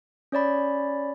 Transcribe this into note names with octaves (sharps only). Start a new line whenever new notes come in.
C#4 C#5 D5 B5